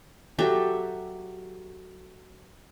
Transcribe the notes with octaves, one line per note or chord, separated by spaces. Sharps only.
F#3 G4 A4 E5